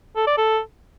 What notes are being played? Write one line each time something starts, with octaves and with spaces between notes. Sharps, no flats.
A4
D5
A4